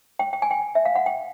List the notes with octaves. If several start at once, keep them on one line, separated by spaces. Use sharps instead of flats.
G5
G5
G#5
G5
E5
F5
F#5
G5